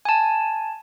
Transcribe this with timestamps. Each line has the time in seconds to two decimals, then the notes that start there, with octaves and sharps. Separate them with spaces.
0.05 G#5 A5